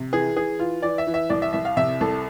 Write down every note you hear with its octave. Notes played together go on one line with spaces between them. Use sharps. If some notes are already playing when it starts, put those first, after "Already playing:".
Already playing: C3
E3 G#4
E3 G#4
E3 F4
E3 D5
E5
E3
E5
C2 D5
E5
C2 E5
F5
C3 E5
C2 A4